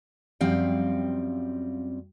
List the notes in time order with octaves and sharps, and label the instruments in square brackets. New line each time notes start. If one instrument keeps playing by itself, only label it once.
[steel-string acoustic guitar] F#2 F3 G3 C4 F5 G5